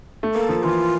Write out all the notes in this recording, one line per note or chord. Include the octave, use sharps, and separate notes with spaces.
A3
A#3 A4
F3
E3 F4